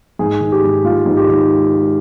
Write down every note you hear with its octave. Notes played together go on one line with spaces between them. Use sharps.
G#2 G#4
D#3
G4
G#2
G#3 F4
G#2
G4
D#3